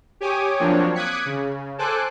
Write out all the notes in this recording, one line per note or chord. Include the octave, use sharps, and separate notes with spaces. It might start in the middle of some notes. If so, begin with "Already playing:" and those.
G4 C#5 G#5 D6 D#6
F3 F#3 A#3 C4 D4 C#5
D6 D#6 F#6 G#6 B6 C#7
C#3
A4 C5 G#5 D6 F#6